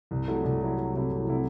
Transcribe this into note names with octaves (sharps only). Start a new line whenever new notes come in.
C2
C3 F#3 A3 E4
C2
C3 F#3 A3 E4
C2
C3 F#3 A3 E4
C2
C3 F#3 A3 E4